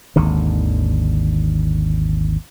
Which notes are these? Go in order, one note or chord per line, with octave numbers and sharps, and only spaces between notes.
G#1 D#2 D3